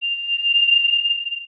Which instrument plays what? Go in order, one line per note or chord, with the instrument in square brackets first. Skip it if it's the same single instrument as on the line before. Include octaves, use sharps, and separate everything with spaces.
[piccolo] F7